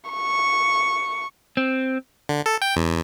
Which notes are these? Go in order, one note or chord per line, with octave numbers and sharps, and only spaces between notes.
C#6
C4
D3
A4
G5
E2